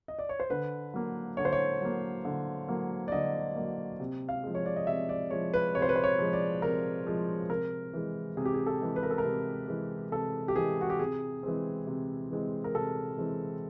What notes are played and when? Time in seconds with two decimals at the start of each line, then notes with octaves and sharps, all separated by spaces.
0.08 D#5
0.19 D5
0.29 C#5
0.40 C5
0.50 D3 B4
0.94 F#3 A#3
1.37 D3 C#5
1.45 C5
1.53 C#5
1.81 F#3 A#3
2.25 D3
2.68 F#3 A#3
3.08 D5
3.12 D3 D#5
3.56 F#3 A#3
4.00 C3
4.29 F5
4.44 F3 G#3
4.55 C#5
4.66 D5
4.76 D#5
4.87 C3 E5
5.09 D5
5.30 F3 G#3 C#5
5.54 B4
5.75 C3 C#5
5.82 C5
5.89 B4
5.96 C5
6.04 C#5
6.19 F3 G#3
6.33 D5
6.62 C3 A#4
7.07 F3 G#3
7.49 C3 A#4
7.93 E3 G#3
8.37 C3 G#4
8.45 G4
8.54 G#4
8.67 A4
8.81 E3 G#3
8.96 B4
9.03 A#4
9.11 A4
9.18 A#4
9.25 C3
9.68 E3 G#3
10.12 C3 A4
10.48 G4
10.56 E3 G#3 G#4
10.81 F#4
10.90 G4
10.99 C3 G#4
11.43 E3 G#3 C4
11.87 C3
12.31 E3 G#3 C4
12.64 A#4
12.74 C3 A4
13.18 E3 G#3 C4